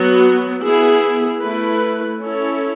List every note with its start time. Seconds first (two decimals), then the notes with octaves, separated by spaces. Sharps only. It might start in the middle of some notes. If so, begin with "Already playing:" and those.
Already playing: F#3 B3 F#4
0.63 B3 E4 G#4
1.41 A3 E4 B4
2.21 C#4 E4 A4 C#5